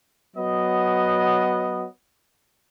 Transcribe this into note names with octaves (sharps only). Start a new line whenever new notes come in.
F#3 B3 D#5